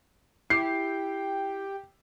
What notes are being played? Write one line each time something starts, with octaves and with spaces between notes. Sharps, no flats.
E4 G4 C7